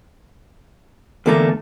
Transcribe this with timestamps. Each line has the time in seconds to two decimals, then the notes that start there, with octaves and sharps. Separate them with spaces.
1.26 E2 D3 A3 A#3 A4 A#5